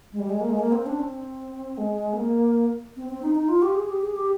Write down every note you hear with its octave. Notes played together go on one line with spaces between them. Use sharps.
G#3
G3
G#3
A#3
G#3
A#3
C4
D4
C4
G#3
C4
A#3
C4
C4
D#4
D#4
F4
G4
G#4
G4
G#4
G4